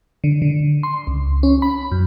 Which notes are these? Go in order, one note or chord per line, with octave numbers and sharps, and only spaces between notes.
D3
D3
C6
C#2
C#4
B5
F#2